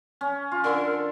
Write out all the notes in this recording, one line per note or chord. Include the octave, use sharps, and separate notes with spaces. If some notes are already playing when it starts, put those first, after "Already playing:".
C#4
F4
D3 A4 A#4